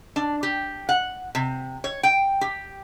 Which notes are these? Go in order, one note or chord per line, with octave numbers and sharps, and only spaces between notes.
D4
G4
F#5
C3
C#5
G5
G4